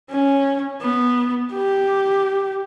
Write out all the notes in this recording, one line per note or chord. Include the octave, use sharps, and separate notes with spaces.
C#4
B3
G4